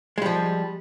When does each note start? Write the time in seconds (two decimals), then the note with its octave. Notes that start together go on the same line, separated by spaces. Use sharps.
0.18 G#3
0.22 G3
0.26 F3